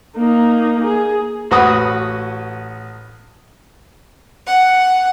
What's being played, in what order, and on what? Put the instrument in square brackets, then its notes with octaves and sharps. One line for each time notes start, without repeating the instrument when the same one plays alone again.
[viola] A#3 D#4
G#4
[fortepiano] A1 F#4 B4 F#5 D#6
[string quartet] F#5